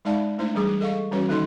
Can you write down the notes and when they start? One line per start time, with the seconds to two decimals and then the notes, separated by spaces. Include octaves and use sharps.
0.05 G#3 D#4 D5 F5 A5 B5
0.38 A3 D4 E4 C5
0.55 E3 G3 G#4 D6
0.80 A4 D#5 F5 C#6
1.11 E3 G3 C#4 F#4 B4 C#5
1.28 D#3 A#3 D#4 A4 D#5 C6